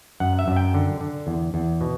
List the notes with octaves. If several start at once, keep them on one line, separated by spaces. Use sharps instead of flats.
F#2 F#5
E5
F#2
G5
D3
D3
E2
E2
B2